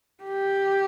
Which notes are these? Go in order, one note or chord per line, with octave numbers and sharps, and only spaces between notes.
G4